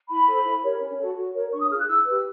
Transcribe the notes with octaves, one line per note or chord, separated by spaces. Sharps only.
E4 B5
A4 C5
E4
G4 A#4 C#5
C#4
F#4 A4 C#5
F#4
A#4 C#5
D4 C#6
D#6
F4 G#4 F6
F#6
E4 E6
G4 B4